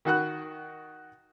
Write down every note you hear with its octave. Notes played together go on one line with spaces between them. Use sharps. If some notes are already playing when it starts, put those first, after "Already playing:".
D#3 F#4 F#5 F#6